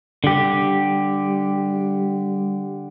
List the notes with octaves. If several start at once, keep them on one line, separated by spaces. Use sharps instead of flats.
D3 G3 G4